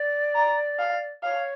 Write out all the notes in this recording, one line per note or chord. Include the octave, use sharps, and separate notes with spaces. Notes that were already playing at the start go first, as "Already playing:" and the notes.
Already playing: D5
A#5
F5
C#5 F5